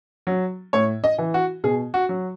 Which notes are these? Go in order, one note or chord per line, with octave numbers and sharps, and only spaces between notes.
F#3
A2 C#5
D#5
E3
F#4
B2 G#4
F#4
F#3